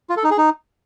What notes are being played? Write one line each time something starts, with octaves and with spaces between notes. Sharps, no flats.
F4
A4
D#4
G#4
D#4